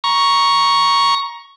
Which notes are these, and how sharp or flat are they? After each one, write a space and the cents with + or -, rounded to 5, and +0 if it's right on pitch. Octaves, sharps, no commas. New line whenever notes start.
A#5 +20 C#6 +0